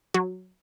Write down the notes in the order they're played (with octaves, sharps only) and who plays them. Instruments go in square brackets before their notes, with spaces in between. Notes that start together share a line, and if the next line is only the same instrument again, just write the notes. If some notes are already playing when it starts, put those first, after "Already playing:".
[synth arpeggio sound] F#3